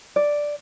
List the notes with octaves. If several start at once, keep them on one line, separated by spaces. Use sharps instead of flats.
D5